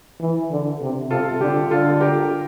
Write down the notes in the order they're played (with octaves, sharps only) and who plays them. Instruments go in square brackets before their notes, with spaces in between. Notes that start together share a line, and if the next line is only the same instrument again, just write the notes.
[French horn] E3
D3
C3
[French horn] C3 [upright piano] F4 A4
[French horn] D3 [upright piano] G4
[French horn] D3 [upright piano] F4 A4
[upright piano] G4 A#4